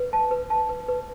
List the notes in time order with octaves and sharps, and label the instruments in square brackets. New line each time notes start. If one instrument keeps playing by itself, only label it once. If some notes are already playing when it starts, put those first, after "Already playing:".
Already playing: [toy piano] B4
A5
B4
A5
B4
B4